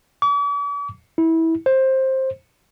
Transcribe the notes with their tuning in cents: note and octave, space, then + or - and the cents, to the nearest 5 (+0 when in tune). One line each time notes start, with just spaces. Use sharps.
D6 -45
E4 -20
C5 +15